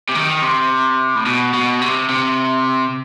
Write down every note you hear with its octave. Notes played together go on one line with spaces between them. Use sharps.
C3
D#3
C3
A2
B2
B2
C3
C3